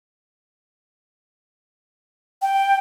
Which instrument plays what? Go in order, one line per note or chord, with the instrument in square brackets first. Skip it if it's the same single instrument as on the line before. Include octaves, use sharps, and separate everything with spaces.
[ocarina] G5